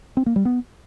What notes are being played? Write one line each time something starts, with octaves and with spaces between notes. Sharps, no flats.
C4
A#3
G3
B3